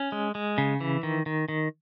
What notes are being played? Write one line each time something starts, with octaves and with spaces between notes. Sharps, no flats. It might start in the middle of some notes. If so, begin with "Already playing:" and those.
Already playing: C#4
G#3
G#3
C#3
E3
D#3
D#3
D#3